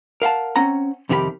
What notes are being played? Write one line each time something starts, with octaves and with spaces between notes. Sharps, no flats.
A#4 F5 F#5 A5
C4 C#4 F#5 A#5
F2 C3 D#3 F#4 G4 B5